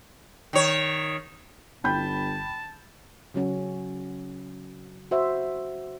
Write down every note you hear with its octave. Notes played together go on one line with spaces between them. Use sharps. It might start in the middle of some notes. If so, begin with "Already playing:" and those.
D#3 C#5
G1 G5 A5 B5 G6
C#3 F#3 C#4 F#4
F#4 C5 E5